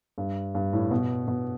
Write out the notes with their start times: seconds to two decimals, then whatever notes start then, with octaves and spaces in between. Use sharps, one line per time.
0.18 G2
0.55 G2
0.73 A2
0.91 B2
1.28 B2